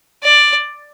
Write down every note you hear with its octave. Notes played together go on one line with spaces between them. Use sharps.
D5